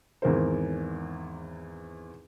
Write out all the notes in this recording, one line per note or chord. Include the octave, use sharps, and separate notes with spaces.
G#1 E2 A#4 C5